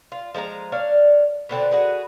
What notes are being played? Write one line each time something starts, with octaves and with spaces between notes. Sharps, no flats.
F4
F3 G#3 D5 A#5
D4 C#5 F5
B2 D3 C4 B4
F#4 G#4 B4